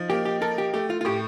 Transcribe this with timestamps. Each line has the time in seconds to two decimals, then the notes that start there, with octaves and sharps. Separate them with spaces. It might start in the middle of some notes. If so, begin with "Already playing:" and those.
Already playing: F3 D#4
0.10 A#3 G4
0.25 G4
0.42 A4 A#4
0.58 G4
0.74 A3 G4
0.90 F4
1.01 F4
1.05 A2 G4